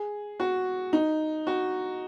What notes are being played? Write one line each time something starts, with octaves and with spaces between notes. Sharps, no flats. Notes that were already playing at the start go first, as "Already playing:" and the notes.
Already playing: G#4
F#4
D#4
F#4